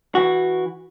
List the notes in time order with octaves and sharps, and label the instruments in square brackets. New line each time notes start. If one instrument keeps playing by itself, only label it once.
[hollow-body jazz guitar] E3 F#4